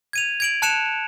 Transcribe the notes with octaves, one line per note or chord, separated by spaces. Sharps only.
G#6 D#7 F7
G#6 D7 F#7
A5 F#6 C#7 E7 F7